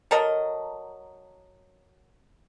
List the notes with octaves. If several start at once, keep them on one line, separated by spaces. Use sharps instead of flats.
F#3 A4 A#4 D#5